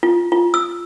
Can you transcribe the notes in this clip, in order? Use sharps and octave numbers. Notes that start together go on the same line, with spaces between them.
F4
F4
E6